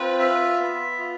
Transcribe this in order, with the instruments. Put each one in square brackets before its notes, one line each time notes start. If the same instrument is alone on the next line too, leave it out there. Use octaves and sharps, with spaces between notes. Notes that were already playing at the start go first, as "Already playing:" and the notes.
Already playing: [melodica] C4 F4 [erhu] B4
[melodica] E5
B3
F4